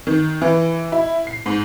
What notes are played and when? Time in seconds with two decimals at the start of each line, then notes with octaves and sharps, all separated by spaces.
0.07 D#3
0.42 E3
0.92 E4
1.27 C7
1.46 G#2